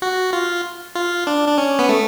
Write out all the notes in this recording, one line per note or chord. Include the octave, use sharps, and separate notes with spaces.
F#4
F4
F4
D4
D4
C#4
B3
A3